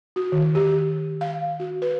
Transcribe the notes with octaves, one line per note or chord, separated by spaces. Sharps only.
F#4
D#3
G4
F5
F#4
B4